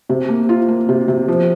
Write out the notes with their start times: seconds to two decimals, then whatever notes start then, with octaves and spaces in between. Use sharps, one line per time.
0.09 C3
0.29 A#3
0.49 F4
0.68 A#3
0.89 C3
1.08 C3
1.28 F3